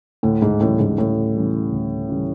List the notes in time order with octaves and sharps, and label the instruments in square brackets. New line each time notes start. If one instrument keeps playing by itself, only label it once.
[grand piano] D2 [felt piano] A2
[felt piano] G#2
[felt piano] A2 [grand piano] C#3 E3 G3
[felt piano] G#2
[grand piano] D2 [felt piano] A2
[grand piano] C#3 E3 G3
D2
C#3 E3 G3